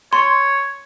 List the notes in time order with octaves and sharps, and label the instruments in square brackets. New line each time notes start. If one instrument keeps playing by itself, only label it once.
[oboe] C#5 [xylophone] C6